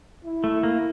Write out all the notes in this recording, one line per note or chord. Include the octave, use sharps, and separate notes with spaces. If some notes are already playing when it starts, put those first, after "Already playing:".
E4
A3
A#3